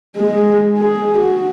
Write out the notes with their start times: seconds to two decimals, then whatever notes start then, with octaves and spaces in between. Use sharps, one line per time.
0.17 G#3
0.78 G#4
1.19 F#4